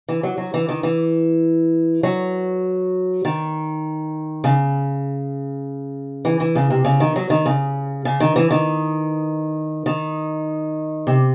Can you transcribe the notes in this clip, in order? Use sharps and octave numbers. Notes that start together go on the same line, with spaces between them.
E3
F#3
F#3
E3
D#3
E3
F#3
D#3
C#3
E3
E3
C#3
C3
C#3
D#3
F#3
D#3
C#3
C#3
D#3
E3
D#3
D#3
C3